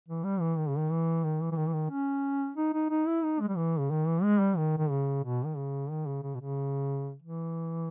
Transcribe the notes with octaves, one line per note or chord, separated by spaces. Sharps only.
E3
G3
E3
D#3
C#3
D#3
E3
D#3
E3
E3
D#3
E3
D#3
C#4
D#4
D#4
D#4
E4
D#4
G#3
G3
E3
C#3
D#3
E3
G#3
G3
D#3
D#3
C#3
B2
D#3
C#3
D#3
C#3
C#3
B2
C#3
E3